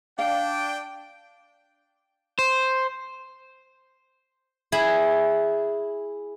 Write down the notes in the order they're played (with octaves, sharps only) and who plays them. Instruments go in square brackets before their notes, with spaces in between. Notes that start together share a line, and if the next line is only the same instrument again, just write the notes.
[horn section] D4 G5 [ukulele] F5
[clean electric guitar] C5
[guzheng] E4 G#4 E5 B5